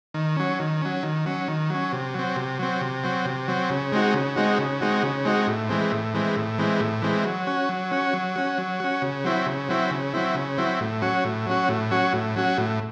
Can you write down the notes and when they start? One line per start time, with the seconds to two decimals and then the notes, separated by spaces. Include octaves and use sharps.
0.14 D#3
0.37 F#3 C#4
0.59 D#3
0.81 F#3 C#4
1.03 D#3
1.26 F#3 C#4
1.48 D#3
1.70 F#3 C#4
1.92 C3
2.14 F#3 C4
2.36 C3
2.59 F#3 C4
2.81 C3
3.04 F#3 C4
3.25 C3
3.48 F#3 C4
3.70 C#3
3.92 G#3 C4 D#4 F#4
4.14 C#3
4.36 G#3 C4 D#4 F#4
4.59 C#3
4.81 G#3 C4 D#4 F#4
5.03 C#3
5.25 G#3 C4 D#4 F#4
5.47 A2
5.69 E3 G#3 C4
5.92 A2
6.14 E3 G#3 C4
6.36 A2
6.58 E3 G#3 C4
6.80 A2
7.02 E3 G#3 C4
7.25 F#3
7.47 C#4 F#4
7.69 F#3
7.91 C#4 F#4
8.13 F#3
8.36 C#4 F#4
8.58 F#3
8.80 C#4 F#4
9.02 C#3
9.24 F#3 C4 E4
9.46 C#3
9.69 F#3 C4 E4
9.91 C#3
10.14 F#3 C4 E4
10.35 C#3
10.58 F#3 C4 E4
10.80 A2
11.02 F#3 C#4 F#4
11.24 A2
11.46 F#3 C#4 F#4
11.69 A2
11.91 F#3 C#4 F#4
12.13 A2
12.35 F#3 C#4 F#4
12.58 A2